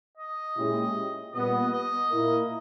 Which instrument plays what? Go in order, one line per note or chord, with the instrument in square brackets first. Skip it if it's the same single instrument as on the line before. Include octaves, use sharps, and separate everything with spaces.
[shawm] D#5
[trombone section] A#2 G#3 C#4 E4 G4
[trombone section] A#2 G3 B3 [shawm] D#5
[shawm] D#5
[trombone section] A#2 A#3 E4 A#4